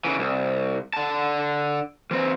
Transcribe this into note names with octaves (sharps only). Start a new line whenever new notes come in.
C#3 E3
C2
D3 A5
E3 C4